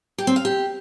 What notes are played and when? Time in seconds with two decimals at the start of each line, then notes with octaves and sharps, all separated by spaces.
0.18 G4
0.27 C4
0.36 F5
0.45 G4